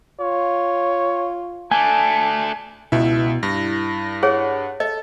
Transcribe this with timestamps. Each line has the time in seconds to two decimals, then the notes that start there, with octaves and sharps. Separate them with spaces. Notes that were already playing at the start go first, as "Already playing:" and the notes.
0.21 F4 C#5
1.71 A3 D4 G#5 A5
2.92 C#2 B2 E4 E5
3.43 G2 A#6
4.23 G#4 C#5 F#5
4.80 A4 D#5